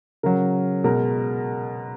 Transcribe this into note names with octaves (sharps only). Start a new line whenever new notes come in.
C#3 F#3 A#4
B2 G#3 A#4